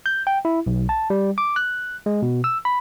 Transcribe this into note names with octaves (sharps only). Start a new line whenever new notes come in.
G6
G5
E4
B1
A5
G3
D6
F#6
G#3
B2
E6
B5